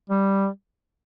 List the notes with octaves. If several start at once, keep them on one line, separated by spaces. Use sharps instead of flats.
G3